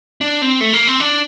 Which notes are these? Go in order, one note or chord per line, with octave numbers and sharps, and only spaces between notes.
D4
C4
A3
A#3
C4
D4